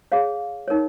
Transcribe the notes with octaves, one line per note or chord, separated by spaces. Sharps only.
G#4 C#5 F5
D#4 A#4 C#5